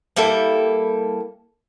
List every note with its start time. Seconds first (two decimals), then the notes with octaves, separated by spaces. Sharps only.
0.16 G3 A#3 E4 A4